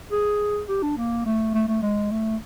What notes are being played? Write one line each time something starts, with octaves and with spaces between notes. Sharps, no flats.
G#4
G4
D4
A#3
A3
A3
A3
G#3
A3